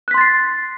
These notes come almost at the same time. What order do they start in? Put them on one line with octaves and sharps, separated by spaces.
F#6 B6 C6 A6 C7